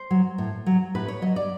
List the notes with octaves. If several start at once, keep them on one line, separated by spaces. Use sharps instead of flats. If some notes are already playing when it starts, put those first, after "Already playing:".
Already playing: C5
F#3
A2
F#3
A2 B4
C#5
F#3 D#5
D5